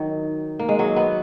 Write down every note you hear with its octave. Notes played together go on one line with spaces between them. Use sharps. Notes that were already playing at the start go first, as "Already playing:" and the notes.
Already playing: D#3 F#3
A#3
G#3
F#3
B3